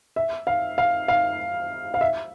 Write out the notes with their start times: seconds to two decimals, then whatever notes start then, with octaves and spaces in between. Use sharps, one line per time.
0.16 E5
0.47 F5
0.78 F5
1.08 F5
1.94 F5
2.01 E5